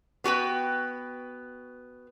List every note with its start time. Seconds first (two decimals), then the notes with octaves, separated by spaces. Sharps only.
0.24 B3 F#4 B4 G5